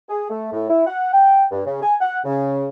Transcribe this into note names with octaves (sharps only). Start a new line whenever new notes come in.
G#4
A3
A2
E4
F#5
G5
G2
C#3
G#5
F#5
C#3